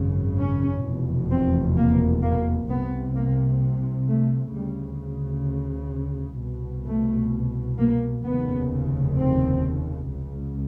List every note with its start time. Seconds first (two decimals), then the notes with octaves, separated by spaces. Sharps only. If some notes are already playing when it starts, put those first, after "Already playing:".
Already playing: G#1 F#2 C#3
0.38 C#4
0.83 F1 E2 B2
1.30 C4
1.77 A#3
2.22 A#3
2.69 C2 C3 B3
3.15 A#3
4.08 A3
4.54 D2 C#3 G3
6.39 C2 B2
6.85 A3
7.78 A#3
8.24 F1 D#2 C#3 B3
9.17 C4
10.09 C#2 C#3